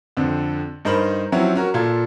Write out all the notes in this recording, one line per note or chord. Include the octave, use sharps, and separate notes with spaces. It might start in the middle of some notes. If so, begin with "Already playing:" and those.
F2 D3 C4
G2 D#4 A#4 C5 B5 F#7
F3 F#3 C4 C#4 E4 F#4
C#4 F#4 A#4
A#2 F4 A4 G#6